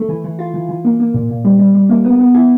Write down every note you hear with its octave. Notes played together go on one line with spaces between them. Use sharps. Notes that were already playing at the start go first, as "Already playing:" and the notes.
Already playing: A3
E3
E3
F4
E3
E3
A#3
A#3
A#2
A#2
G3
G3
G3
A#3
B3
B3
E4